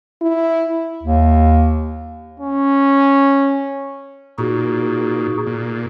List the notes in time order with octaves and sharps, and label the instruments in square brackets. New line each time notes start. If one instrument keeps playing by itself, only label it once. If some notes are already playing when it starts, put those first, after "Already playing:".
[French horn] E4
[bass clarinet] D#2
[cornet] C#4
[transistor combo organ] A#2 [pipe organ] D#4 F#4 G#4
[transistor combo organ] A#2